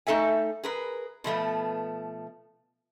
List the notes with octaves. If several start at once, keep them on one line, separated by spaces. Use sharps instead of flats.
A3 D#4 A4 E5 G#5
G#4 A#4 B4
B2 F3 A3 B3